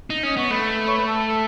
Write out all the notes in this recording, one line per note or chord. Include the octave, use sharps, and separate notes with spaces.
D#4
C#4 D#5
B3 C#5
A3 B4
C#5
B4
A4